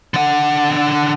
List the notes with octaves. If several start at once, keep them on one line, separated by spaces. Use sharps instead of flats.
D3 F#5